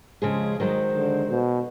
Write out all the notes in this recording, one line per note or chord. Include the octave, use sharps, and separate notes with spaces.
C#3 F3 G#3 G#4
D#3 F#3 G#3 C5
D3
B2